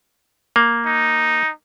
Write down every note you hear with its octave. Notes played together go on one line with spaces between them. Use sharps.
A#3
D#4